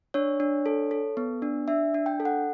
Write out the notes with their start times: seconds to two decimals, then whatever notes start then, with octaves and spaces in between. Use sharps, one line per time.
0.14 D4 C#5
0.40 D4
0.66 A4
0.91 A4
1.17 B3
1.42 D4
1.68 D4 E5
1.94 D4
2.06 G5
2.20 A4
2.25 F#5